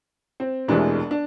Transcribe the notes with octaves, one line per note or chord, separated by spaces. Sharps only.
C4
E1 D2 C3 E3 G#3 D4
D4